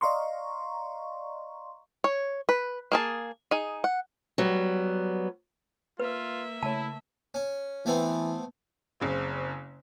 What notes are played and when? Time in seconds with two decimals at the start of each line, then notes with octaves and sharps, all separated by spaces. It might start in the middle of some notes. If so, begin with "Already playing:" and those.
0.01 D5 D#5 F5 A#5 C6 C#6
2.04 C#5
2.49 B4
2.92 A#3 G#4 A5
3.51 D#4 G#4
3.84 F#5
4.38 F#3 G3 B3
6.00 A#3 F4 B4 E5
6.63 C#3 A3 E4 C#5 A5
7.34 C#4
7.86 E3 A3 B3 C4
9.00 F#1 C#3 C4